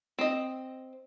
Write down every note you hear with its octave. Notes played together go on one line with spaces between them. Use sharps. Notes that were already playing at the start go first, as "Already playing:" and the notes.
C4 D#5